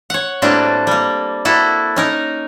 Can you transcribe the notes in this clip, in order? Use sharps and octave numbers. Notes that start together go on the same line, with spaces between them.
C#5 F#5
A2 G3 A#3 C4 D4 F#4
G3 A#3
A#3 E4 F#4 A4
C#4 D#4 A#4